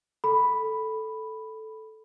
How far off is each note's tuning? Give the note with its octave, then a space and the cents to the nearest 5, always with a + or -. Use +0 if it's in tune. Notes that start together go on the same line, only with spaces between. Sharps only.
A4 -5 B5 +0